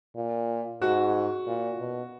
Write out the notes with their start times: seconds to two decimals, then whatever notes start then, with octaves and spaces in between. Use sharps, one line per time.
0.16 A#2
0.82 G#2 F#4
1.47 A#2
1.79 B2